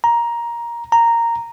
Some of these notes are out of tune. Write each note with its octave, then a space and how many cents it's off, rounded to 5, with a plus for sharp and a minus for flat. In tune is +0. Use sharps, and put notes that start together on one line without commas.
A#5 +15
A#5 -5